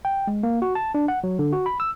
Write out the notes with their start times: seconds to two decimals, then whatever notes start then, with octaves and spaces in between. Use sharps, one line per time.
0.05 G5
0.27 G#3
0.43 A#3
0.62 F#4
0.75 A5
0.95 D4
1.08 F#5
1.24 F#3
1.39 D3
1.53 F#4
1.66 B5
1.80 E6